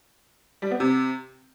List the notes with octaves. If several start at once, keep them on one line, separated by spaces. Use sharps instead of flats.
G3
B3
C3